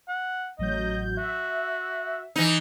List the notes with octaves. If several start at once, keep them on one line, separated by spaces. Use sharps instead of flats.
F#5
A1 F#3 D#5 G6
F#4 E5
E3 D#4